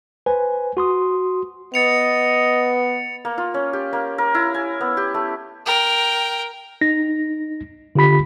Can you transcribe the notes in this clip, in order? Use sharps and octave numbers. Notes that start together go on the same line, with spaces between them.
B4 C5 G#5
F#4 C6 D#6
B3 D#5 A6 C#7 F7
A#3
F4
C#4
G4
A#3
A#4
E4
G#5
B3
G4
A3
A#4 G5
D#4 A#6
D3 F4 G4 B5 B6